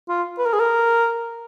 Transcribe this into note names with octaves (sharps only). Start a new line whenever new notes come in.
F4
B4
A#4
G#4
A#4